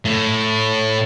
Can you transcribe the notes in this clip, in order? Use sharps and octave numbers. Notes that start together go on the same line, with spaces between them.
A2